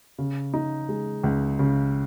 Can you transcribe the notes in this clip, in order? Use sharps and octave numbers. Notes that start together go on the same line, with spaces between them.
C#3
D#4
G#3
C#2
C#3